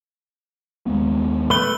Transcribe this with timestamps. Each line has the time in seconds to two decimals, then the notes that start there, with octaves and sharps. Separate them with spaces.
0.86 D#2 G#3 B3
1.50 A3 B4 E6 G7